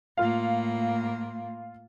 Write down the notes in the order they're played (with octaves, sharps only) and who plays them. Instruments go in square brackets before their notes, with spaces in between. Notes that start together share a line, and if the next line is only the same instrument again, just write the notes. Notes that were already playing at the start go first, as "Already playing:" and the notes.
[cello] A2 A#3 [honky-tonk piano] F4 F5